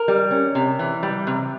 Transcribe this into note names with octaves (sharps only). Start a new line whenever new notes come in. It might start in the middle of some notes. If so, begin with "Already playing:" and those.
Already playing: A#4
G3
C#4
C3
E3
G3
C3